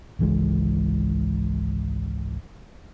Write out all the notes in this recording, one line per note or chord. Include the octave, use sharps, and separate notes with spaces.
G#1 C#2 E3 G#3